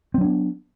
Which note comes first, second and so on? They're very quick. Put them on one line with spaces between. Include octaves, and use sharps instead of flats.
C4 F#3 D4 B3